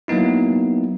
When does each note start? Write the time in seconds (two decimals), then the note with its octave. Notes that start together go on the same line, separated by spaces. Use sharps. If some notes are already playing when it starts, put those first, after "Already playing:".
0.08 F#3 A#3 B3 D#4 E4